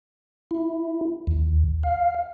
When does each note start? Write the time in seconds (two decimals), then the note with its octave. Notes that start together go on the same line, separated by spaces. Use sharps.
0.51 E4
1.27 D#2
1.83 F5